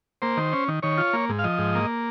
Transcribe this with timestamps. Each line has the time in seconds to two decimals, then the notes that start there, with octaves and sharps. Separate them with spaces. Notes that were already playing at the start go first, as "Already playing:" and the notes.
0.22 A#3 C5
0.37 D#3
0.53 C#4
0.68 D#3
0.83 D#3 C#5
0.98 F4
1.13 A#3
1.29 G#2
1.39 F5
1.44 F3 D#5
1.59 G#2
1.75 A#3